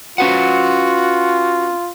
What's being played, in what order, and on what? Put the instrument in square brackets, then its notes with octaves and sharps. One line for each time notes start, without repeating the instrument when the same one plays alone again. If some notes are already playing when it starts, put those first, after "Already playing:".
[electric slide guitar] C#4 B4 F#5 [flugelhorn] F4 [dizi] F#4